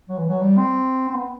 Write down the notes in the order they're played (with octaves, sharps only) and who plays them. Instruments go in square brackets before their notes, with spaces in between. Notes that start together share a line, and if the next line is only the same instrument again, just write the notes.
[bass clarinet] F#3
E3
F#3
G3
C4
C4
B3